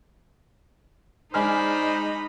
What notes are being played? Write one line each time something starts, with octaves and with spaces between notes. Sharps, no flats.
G#3 D#4 C5 D5 G#5 B5 F6